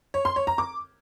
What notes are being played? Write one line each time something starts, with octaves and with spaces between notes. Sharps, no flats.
C#5
C6
C#5
A#5
D6